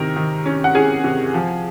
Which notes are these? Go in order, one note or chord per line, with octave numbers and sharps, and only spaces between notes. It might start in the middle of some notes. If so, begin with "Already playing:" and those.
Already playing: C3 D#3 A#4
D#3
C#4
F#5
C#4 G#4 G#5
C3
F3